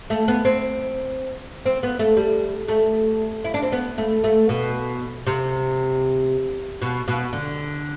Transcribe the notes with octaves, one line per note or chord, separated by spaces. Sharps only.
A3
B3
C4
C4
B3
A3
G3
A3
E4
D4
C4
B3
A3
A3
B2
C3
B2
B2
D3